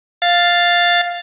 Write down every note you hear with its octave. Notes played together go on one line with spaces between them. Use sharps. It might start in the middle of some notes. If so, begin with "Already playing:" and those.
F5 A6